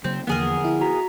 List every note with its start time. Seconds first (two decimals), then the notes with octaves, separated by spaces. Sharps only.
0.04 C#3 F#3 A#3 C4
0.27 E2 D3 F3 A#3 B3 G#4 A#4
0.64 E4
0.81 F#4 A#5 B6